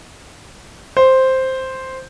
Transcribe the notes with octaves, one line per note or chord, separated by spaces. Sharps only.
C5